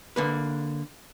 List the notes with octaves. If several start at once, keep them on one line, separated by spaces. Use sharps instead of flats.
D3 A#3 B4